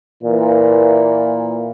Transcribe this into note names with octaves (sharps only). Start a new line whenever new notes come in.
A#2 E3